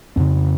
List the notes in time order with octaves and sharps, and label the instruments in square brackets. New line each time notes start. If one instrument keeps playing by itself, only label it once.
[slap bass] F2 C#3 C4